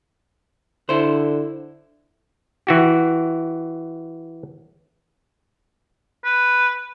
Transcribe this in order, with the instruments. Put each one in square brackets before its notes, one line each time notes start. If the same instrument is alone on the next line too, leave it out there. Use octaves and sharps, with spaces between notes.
[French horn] D3 [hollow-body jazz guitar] E4 C5
[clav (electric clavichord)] E3 F#4 G4
[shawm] B4